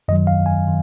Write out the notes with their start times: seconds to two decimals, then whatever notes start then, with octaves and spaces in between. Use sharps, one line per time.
0.08 F#2 D#3 F#3 D#5
0.27 F5
0.46 G#5
0.67 D#3